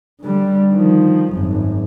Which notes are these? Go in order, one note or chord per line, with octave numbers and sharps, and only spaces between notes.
D3 G3
D#3 F3
G#1 F#2